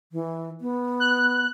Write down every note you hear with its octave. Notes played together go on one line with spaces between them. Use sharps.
E3
B3
F#6